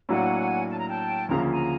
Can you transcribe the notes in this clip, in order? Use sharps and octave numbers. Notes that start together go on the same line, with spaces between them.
A2 F#3 A#3 D4 F#4 F#5 G#5
A5
A#5
G5 A5
D2 C#3 F3 A#3 A#5
G#5 A#5